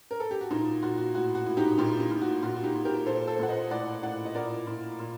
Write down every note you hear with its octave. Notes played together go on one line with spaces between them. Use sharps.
A#4
A4
G4
F#4
A#2 D#4
A#2 F#4
F#4
A2 F#4
F#4
A2
D#4 G4
A#2 D#4 G4
D#4
A#2
F#4
A#2 F#4
F#4
D#4 G4
A#2
G4 A#4
A#2 A4 C5
A4 C5
A#2 F#5
C5 D#5
A2 D5 F#5
A2 D5 F#5
D#5
A#2 A#4 D5
A#2
A#2